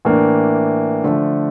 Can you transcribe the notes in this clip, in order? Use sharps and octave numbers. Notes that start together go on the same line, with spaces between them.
A2 E3 A#3 D4
D3 F3 A3